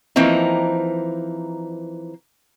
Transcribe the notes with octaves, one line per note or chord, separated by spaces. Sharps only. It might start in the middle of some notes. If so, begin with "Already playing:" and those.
E3 F3 A#3 C4 D#4